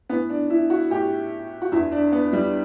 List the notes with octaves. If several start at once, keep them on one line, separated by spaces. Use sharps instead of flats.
A2 E3 B3
D4
E4
F#4
A2 E3 G4
F#4
E2 D3 E4
D4
B3
G3